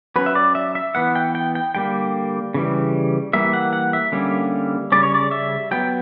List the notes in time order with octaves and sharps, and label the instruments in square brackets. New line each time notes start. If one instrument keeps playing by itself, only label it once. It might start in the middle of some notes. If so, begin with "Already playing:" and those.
[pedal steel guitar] F#3 C#4 B4
E5
D5
E5
E5
E3 B3 F#5
G5
G5
G5
D3 G3 A#3 G5
C#3 E3 G3
E3 G3 A#3 E5
F#5
F#5
E5
D3 G3 A#3 C#4
C#3 G3 C#4 D5
C#5
D5
E5
F#3 B3 G5